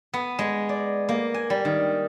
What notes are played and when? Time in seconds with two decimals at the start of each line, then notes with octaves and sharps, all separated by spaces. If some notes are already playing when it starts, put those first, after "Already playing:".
0.14 B3
0.39 G#3
0.69 D5
1.09 A#3
1.34 G#5
1.50 G3
1.65 D#3